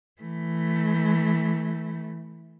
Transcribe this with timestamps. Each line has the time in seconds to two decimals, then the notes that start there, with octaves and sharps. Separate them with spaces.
0.22 E3 A3